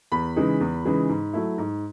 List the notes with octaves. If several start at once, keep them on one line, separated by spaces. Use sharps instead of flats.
E2 B5
C#3 E3 G#3 D#4
E2
C#3 E3 G#3 D#4
G#2
F#3 A3 E4
G#2